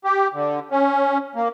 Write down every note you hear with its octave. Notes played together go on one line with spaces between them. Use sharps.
G4
D3
C#4
A#3